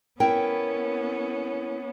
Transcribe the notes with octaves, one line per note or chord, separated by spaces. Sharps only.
B3 C#4 E4 A#4 G5